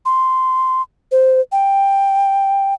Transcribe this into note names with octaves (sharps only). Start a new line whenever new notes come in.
C6
C5
G5